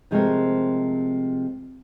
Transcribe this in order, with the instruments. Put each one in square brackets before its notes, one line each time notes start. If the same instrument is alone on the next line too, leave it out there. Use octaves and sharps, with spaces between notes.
[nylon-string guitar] C3 F3 G#3 A3 C4 A#4